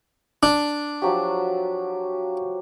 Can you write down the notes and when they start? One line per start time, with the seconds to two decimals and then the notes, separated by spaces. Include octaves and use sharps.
0.43 D4
1.02 F3 F#3 G4